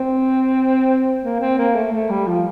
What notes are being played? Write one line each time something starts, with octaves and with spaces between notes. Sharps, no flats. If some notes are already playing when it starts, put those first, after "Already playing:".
Already playing: C4
A#3
C4
A#3
A3
A3
G3
F3